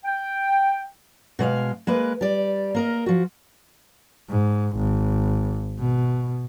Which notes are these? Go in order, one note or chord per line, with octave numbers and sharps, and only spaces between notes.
G5
B2 G#3 E5 F5
G#3 A#3 B4
G3 D5
A#3 A#4 D#5
F3 F#4
G#2
G#1
B2